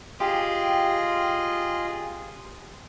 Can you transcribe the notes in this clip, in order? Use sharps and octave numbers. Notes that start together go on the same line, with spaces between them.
F4 G4 G#4 D#5